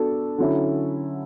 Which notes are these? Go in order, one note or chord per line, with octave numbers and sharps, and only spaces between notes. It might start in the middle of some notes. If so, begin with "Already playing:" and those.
Already playing: B3 D4 F#4 A4
D3 F#3 C#4 E4